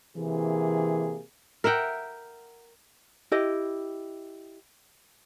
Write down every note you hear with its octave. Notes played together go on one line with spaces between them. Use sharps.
C3 E3 A#3 G#4
A#4 E5 F#5 G5
E4 G4 D#5